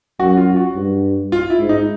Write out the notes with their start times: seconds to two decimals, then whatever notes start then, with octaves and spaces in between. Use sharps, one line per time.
0.19 F#2 F#4
0.37 F4
0.56 F#4
0.75 G2
1.32 F4
1.50 E4
1.60 G#2
1.69 D#4